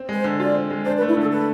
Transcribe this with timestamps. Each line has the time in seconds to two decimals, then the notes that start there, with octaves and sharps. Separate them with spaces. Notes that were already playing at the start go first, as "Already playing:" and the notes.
Already playing: C4
0.09 G#3 B4
0.17 C5
0.24 D3
0.39 F4 D5
0.55 C4
0.70 G#3
0.86 D4 C5
0.97 B4
1.02 A3
1.09 E4
1.17 D3 A4
1.32 A4 B4